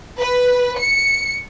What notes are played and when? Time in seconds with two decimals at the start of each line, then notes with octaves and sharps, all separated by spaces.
0.19 B4
0.78 C#7